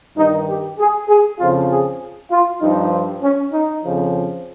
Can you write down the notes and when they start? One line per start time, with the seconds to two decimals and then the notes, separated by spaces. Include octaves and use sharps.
0.17 G2 D#3 D#4
0.49 G4
0.79 G#4
1.09 G#4
1.39 F2 C#3 F3 F4
1.71 G#4
2.31 F4
2.62 G2 F3 D#4
3.23 C#4
3.53 D#4
3.83 F2 C#3 F3